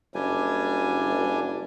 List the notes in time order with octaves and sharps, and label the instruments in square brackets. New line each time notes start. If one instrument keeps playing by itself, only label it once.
[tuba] F#1 [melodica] G3 D4 G#5